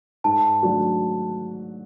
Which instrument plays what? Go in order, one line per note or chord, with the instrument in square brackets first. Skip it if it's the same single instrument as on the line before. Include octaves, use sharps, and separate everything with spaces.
[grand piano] G#2 [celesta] A5
[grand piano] F#3 A3 D4 F#4